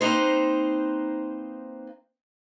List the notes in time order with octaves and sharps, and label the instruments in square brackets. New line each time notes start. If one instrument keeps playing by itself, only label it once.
[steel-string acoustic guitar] A#3 C4 D#4 B4 C5